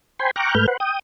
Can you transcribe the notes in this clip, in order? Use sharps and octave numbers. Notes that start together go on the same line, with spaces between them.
C5 G5 G#5 B5 C6
G5 A#5 C#6 D6 F6 F#6
G#2 A3 B4 F6 G6
B4 C5 F#5
G5 D#6